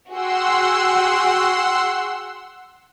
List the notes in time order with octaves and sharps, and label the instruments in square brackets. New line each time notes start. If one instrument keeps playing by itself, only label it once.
[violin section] F#4 G#4 G5 [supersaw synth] F#5 C6 E6